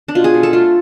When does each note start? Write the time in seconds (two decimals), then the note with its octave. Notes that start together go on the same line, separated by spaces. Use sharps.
0.08 D4
0.15 B2 F4
0.24 G#4
0.34 B2
0.43 A4
0.53 A3 F4